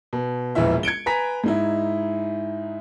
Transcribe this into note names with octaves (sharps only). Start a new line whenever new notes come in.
B2
E1 A#1 E3 E4 E5
G#6 C#7 D7 G7
B4 G#5 A#5 B6
G#2 D#4 E4